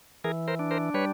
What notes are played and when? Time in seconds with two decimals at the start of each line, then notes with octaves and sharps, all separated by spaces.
0.24 E3 G#4 A#4
0.48 A#4 C5
0.59 D4
0.71 A#4 C5
0.94 G3 B4 C#5